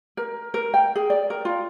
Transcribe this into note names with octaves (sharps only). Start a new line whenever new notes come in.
A#4
A#4
G5
G#4
D5
A#4
F4